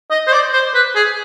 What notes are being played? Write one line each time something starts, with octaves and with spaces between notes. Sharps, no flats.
D#5
C5
D5
C5
B4
G#4